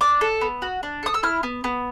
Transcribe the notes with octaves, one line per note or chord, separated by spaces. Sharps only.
D4 D6
A4
B3
F#4
D4
A4 D#6
E6
E4 F6
B3
B3